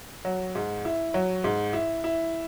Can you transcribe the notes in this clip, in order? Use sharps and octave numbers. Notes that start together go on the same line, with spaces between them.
F#3
G#2
E4
F#3
G#2
E4
E4